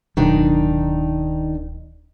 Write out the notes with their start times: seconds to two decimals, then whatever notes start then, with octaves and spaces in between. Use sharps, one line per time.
0.17 D1 B2 D#3 F#3 D4 D#4